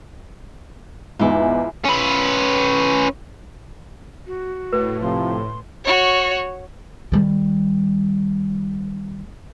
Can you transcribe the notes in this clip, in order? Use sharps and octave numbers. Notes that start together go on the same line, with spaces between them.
E2 G#2 E4 F4
C#4 B4
F#4
A2 B4
C3 F3 C6
F#4 C#5
D#3 G3